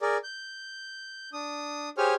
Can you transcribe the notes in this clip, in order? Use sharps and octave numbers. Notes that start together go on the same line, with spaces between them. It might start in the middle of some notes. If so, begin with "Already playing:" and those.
G#4 A#4 D5
G6
D4 D#6
G4 G#4 C5 C#5 G#5 F6